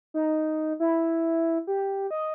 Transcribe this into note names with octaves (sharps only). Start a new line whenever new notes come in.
D#4
E4
G4
D#5